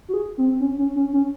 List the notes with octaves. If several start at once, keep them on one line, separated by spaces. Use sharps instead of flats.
F#4
G#4
C4
C#4
C#4
C#4
C#4